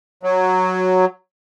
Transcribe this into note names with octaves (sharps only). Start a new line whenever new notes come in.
F#3